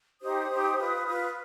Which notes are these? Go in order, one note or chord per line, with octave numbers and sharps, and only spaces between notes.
D#4 G4 C5 D#6
D#4 G4 C5
F4 B4
F4 B4